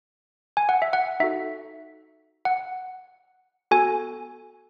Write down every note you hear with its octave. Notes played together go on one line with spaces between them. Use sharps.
G#5
F#5
E5
F#5
D#4 F#4 A4 E5
F#5
B3 F#4 A4 G#5